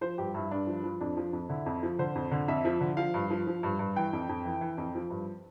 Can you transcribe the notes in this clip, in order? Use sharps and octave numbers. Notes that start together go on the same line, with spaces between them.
F3 C5
G2 G4
G2 E4
G2 D4
F3
F3
F2 D4
F3
F2
D3 E4
F2
F3
D3 C5
F2
D3
F2 E5
F3
D3
F3 F5
G2
F3
F3
G2
G2
E3 G5
F2
F2
E3
E3
F2
F3
G2